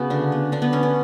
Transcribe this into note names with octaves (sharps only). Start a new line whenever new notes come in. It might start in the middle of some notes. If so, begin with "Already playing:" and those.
Already playing: C#3 B3 F#4
D3 D4
B3
D3 D4
B3
D3 C#4
C#4